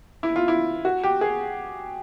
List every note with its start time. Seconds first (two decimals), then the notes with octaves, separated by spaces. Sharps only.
0.23 E4
0.36 F4
0.48 E4
0.85 F#4
1.03 G4
1.21 G#4